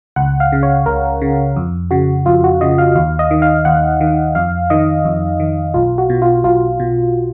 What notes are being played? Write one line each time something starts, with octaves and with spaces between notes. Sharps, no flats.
C#2 F#5
F5
C#3
C#5
C#2 A#4
C#3
F2
C#3 F#4
F2 F4
F#4
C#3 D#5
F5
D#2 F5
D#5
D#3
F5
D#2 F#5
D#3
F2 F5
D#3 D#5
F2
D#3
B1 F4
F#4
B2
F4
B1 F4
B2